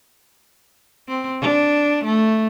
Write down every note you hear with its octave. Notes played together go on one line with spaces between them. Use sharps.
C4
D4
A3